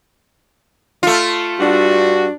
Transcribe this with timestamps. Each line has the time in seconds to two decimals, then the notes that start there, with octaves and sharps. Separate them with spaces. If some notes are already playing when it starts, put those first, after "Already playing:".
1.03 A3 F4
1.60 G2 D4 F#4